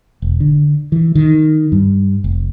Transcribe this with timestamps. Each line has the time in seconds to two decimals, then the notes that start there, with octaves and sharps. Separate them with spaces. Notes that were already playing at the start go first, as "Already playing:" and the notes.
0.22 E1
0.40 D3
0.92 E3
1.15 D#3
1.72 G2
2.24 F1